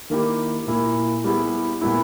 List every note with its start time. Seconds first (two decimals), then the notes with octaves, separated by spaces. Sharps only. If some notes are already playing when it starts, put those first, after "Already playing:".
0.10 D#3 A#3 E4 G4
0.67 A#2 A#3 E4
1.24 G3 B3 E4 G#4
1.81 A#2 G3 B3 E4